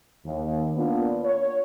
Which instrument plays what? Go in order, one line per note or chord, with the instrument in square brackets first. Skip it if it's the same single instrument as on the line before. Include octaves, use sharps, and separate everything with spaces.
[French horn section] D#2
A#3 B3 D4 F4
C#5